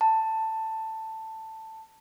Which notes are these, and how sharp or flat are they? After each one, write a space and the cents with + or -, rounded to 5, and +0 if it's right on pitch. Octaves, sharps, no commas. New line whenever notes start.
A5 +10